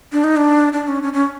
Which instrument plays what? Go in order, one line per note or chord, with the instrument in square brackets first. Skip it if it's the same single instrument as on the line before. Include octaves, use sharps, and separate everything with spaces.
[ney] D4
D#4
D4
D4
C#4
C#4
C#4